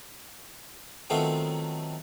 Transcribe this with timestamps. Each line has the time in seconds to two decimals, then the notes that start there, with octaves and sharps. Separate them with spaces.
1.10 D#3 F#3 A3 B3 C4 F4